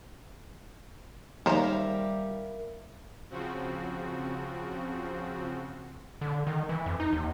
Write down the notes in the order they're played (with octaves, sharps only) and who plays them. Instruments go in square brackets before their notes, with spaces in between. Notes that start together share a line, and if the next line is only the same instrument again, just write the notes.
[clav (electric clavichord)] D#2 [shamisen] C#3 C5 A#5 [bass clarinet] G3 [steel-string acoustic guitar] A#4 E5 F5
[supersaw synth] C#3 F3 C4 F#4
[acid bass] D3
D#3
E3
F2
D#4
D#2